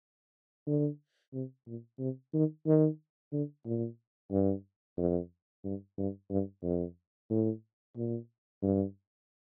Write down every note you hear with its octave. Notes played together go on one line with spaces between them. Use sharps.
D3
C3
A#2
C3
D#3
D#3
D3
A#2
G2
F2
G2
G2
G2
F2
A2
A#2
G2